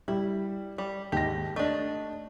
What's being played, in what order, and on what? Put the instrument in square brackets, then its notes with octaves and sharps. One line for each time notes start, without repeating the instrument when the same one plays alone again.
[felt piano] G3 [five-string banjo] E4
[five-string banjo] G3
[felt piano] D#2 G#2 A#6 [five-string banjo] G4
[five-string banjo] A3 D4 [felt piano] D#5